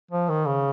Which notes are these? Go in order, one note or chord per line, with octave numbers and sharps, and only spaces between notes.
F3
D#3
C#3